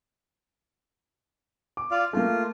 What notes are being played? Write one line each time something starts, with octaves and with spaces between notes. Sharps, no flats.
D6
F4 D5 F5
A3 A#3 F4